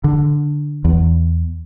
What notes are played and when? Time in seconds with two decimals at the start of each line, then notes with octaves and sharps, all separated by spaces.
0.04 D3
0.85 E2